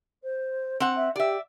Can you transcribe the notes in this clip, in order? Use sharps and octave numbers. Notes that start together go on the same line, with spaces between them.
C5
C4 F#5
E5
G4 D5 E5